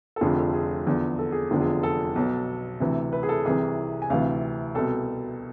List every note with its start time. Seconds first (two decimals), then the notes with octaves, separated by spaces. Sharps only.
0.16 A4
0.21 F1 F2 D3 F3 G#4
0.37 A4
0.54 G#4
0.86 E2 D3 F3
1.19 A4
1.32 G#4
1.51 F1 E2 D3 F3
1.61 G#4
1.83 A4
2.15 B1 B2
2.80 D2 C3 E3
3.13 B4
3.23 G#4
3.29 A4
3.45 C2 C3 E3 G#4
4.02 G#5
4.10 D2 C3 E3 F5
4.75 C2 B2 A4